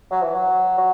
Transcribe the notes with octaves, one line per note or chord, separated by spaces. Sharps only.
F#3
E3
F#3
F#3